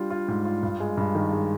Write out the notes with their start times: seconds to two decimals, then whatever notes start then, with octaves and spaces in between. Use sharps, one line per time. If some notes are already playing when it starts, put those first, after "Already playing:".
Already playing: G3 D4 F4
0.10 F4
0.28 G#2
0.45 F4
0.63 G2
0.80 G#3
0.97 G2
1.15 D#3
1.33 G#3